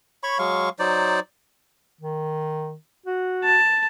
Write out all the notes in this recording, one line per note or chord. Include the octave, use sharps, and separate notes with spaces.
C#5 B5 C#6
F#3 G#3 F5 C#6
F#3 D#4 C5 D5
D#3
F#4
A5